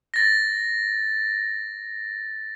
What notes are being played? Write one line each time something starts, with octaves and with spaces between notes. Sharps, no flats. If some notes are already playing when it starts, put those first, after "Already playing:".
A6 A#6